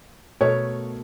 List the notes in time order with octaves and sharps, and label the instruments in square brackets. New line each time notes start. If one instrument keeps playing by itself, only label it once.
[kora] B2 A3 A#4 [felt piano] C#5